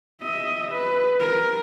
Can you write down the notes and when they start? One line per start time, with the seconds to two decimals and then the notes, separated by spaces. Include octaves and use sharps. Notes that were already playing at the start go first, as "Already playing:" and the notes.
0.22 D#5 E5
0.72 B4
1.20 A#4